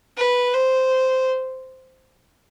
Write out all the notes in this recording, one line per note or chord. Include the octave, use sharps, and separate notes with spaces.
B4
C5